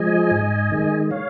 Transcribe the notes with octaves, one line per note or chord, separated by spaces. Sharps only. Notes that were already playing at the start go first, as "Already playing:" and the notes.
Already playing: F3 G#3 D#5 G#5
G#2
D#3 G#3
C#5 F5